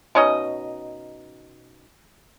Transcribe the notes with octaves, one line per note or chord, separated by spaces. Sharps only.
B2 C#4 D#4 D#5